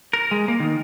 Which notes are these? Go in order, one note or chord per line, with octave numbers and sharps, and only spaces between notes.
A#4
G#3
A#3
D#3